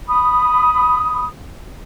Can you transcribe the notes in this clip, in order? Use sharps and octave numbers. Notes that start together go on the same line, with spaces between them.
B5 D#6